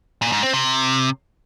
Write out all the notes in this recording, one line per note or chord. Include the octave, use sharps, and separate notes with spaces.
A#2
G#2
C4
C3